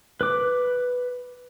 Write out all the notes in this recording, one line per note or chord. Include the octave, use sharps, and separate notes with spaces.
B4 D6